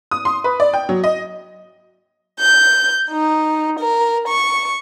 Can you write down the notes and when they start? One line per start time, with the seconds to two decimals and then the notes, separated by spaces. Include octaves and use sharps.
0.11 D#6
0.25 C6
0.44 B4
0.60 D5
0.73 G5
0.89 F#3
1.04 D#5
2.40 G6
3.09 D#4
3.79 A#4
4.28 C#6